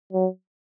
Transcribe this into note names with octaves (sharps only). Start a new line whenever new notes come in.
F#3